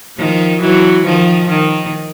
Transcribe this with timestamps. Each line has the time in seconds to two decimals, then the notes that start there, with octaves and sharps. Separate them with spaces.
0.17 D#3 F3
0.61 E3 F#3
1.05 D#3 F3
1.49 D#3